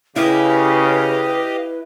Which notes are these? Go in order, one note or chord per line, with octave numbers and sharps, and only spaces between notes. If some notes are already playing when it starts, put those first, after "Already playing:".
C#3 E4 G4 B4 D#5 F5